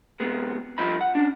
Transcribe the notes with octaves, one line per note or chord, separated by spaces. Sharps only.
C3 G#3 B3
G2 F3 D#4 B5
F#5
C#4 D4